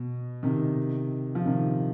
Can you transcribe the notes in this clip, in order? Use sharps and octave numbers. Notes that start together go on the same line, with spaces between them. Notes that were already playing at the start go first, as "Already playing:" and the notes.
Already playing: B2
C3 D#3
F3
C3 D#3